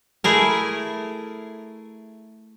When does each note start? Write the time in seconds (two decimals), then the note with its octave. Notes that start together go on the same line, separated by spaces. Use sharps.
0.24 A3 E4 G#4 A#4